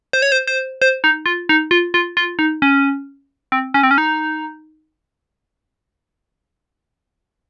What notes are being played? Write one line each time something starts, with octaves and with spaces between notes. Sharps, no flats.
C5
C#5
C5
C5
C5
D#4
F4
D#4
F4
F4
F4
D#4
C#4
C4
C#4
C4
C#4
D#4